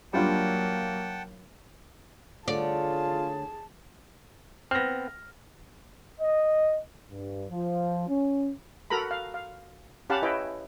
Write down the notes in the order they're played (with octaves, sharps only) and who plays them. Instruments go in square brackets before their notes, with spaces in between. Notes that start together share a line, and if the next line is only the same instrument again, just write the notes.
[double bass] F#3 A#3 [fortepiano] G3 D4 F4 [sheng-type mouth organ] F#5 G5 A5
[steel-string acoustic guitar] D3 A3 C#5 [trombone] F4 [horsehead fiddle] G#4 A5 [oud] D5
[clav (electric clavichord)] B3 C4 [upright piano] F6 A#6
[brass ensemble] D#5
G2
F3
C#4
[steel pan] F#4 A4 A#4 A#5 B5
F5
F5
C#4 G4 F5 F#5 A5 B5
E4 B4 C#5 D#5 E5 G5